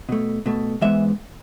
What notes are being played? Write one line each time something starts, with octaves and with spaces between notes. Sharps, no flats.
B2 A3
B2 A3
G#2 E3 G#3 B3 E5